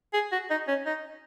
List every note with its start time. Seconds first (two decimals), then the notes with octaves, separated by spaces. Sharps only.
0.14 G#4
0.32 F#4
0.50 D#4
0.68 C#4
0.86 D#4